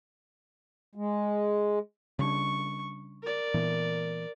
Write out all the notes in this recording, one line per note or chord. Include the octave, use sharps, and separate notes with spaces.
G#3
C#3 G3 D4 C#6
A#4 D5
A#2 E3 B3